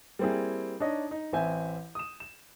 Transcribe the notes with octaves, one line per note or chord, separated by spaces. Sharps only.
G3 A#3 C4 E4 G#4
D4 D#4 C#5 D#5
D#4
A1 C4 E5 G#5 G6
D#6 E7
E7